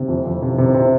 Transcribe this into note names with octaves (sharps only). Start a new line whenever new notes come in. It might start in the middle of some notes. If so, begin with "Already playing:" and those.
Already playing: C3
F2
F2
C3
C3
C3